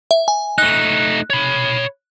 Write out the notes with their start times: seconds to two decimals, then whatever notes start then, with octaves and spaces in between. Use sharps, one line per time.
0.11 E5
0.28 G#5
0.58 A3 D#4 F#6
1.30 C#5 B5